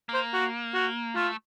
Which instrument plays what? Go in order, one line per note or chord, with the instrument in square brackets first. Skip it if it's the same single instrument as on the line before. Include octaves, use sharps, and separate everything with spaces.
[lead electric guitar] A#3
[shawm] C5
F#4
F#4
[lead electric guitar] A3 [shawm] F4